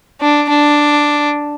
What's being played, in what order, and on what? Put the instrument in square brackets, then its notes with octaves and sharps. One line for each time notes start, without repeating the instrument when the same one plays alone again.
[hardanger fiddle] D4
D4